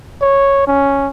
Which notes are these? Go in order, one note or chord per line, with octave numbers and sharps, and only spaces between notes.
C#5
C#4